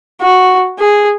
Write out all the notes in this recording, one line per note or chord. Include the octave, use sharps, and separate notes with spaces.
F#4
G#4